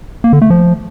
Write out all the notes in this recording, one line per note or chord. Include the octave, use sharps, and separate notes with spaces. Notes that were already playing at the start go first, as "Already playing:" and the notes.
A#3
D3
A3
F3